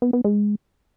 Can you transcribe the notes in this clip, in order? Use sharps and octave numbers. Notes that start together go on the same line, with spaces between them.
B3
B3
G#3